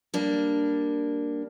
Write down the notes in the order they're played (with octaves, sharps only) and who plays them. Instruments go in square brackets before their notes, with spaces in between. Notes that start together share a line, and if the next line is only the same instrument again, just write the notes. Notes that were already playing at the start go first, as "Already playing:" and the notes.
[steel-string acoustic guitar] G3 A#3 D4